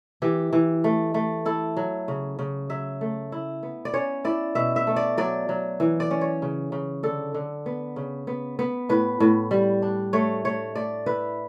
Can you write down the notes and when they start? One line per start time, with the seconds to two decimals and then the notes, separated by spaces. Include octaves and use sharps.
0.22 E3 G4
0.53 E3
0.84 A3
1.14 A3
1.45 E4 A4
1.77 F#3
2.08 C#3
2.39 C#3
2.70 F#3 E5
3.01 A3
3.32 E4
3.63 B3
3.85 D5
3.94 C#4 C#5
4.24 E4 D5
4.55 B2 E5
4.76 E5
4.87 A3
4.96 D5
5.18 F#3 D5
5.49 F#3
5.80 E3
6.00 D5
6.11 C#4
6.21 C#5
6.42 C#3
6.72 C#3
7.03 D3 A4
7.34 D3
7.66 B3
7.96 C#3
8.27 B3
8.59 B3
8.89 A2 B4
9.20 A2
9.51 G3
9.82 D4
10.13 A3 C#5
10.45 A3 C#5
10.75 A3 D5
11.06 E4 B4